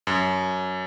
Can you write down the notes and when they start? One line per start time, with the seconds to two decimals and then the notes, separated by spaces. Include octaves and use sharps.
0.07 F#2